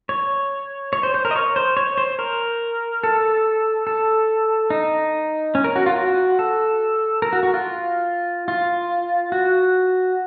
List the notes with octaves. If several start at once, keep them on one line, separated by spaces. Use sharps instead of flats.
C#5
C#5
C5
C5
A#4
D#5
C#5
C5
C#5
C5
A#4
A4
A4
D#4
C#4
A#4
F#4
F4
F#4
A4
A#4
F#4
F#4
F4
F4
F#4